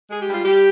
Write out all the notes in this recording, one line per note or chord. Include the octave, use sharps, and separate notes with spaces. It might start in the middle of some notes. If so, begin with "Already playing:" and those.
G#3 G#4
G4
G3
F4
G3 G4